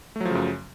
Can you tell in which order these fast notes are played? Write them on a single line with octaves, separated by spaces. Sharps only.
A3 F#3 F3 C#3 F#2